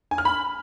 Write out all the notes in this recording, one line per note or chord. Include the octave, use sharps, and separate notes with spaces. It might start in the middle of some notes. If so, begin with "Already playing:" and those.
G#5
F6
B5